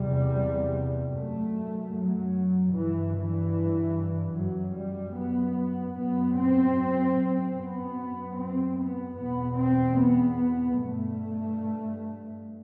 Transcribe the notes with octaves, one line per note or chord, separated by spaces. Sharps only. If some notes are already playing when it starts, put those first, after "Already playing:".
Already playing: E2 C3 G3
F#2 A3
F#3
G2 E3
E3
F#2 F#3
G3
B3
F#2 B3
C4
F#2 B3
C4
B3
E2 B2 B3
C4
B3
G2 A3